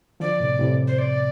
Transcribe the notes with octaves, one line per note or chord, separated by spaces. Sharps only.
D3 F3 D5
A2 C3
A2 C3
C5
D5